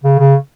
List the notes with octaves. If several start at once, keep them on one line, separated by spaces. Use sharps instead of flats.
C#3
C#3